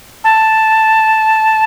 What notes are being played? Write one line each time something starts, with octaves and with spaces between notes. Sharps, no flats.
A5